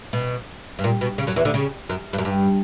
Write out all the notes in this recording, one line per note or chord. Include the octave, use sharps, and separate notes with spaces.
B2
G2
A#2
B2
C#3
F#2 F#3
E2 E3
D2 D3
C#3
F#2
G2
F#2
G2